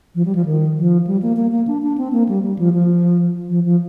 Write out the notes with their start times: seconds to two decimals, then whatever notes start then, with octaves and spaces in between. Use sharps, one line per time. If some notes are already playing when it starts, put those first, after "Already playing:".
0.15 F3
0.25 G3
0.35 F3
0.45 D#3
0.77 F3
1.07 G3
1.22 A#3
1.36 A#3
1.52 A#3
1.67 D4
1.82 D4
1.98 C4
2.12 A#3
2.29 G3
2.43 G3
2.59 F3
2.73 F3
3.49 F3
3.65 F3